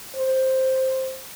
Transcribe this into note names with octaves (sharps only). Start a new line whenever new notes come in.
C5